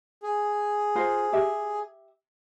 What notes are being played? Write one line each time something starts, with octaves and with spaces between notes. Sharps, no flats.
G#4
F4 A#4 C5
G4 E5